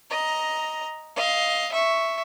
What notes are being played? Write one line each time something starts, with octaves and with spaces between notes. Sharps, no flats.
D#5 A#5
D#5 F5
E5 C#6